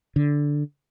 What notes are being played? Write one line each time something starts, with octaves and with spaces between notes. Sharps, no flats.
D3